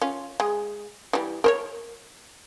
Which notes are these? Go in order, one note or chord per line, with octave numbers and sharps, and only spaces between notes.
C#4 F4
G#3 G#4
E3 G3
A#4 C5 C#5